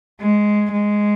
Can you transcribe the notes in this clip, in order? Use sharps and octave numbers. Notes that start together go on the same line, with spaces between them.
G#3
G#3